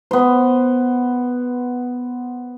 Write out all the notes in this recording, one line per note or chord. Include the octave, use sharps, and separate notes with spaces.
B3 C5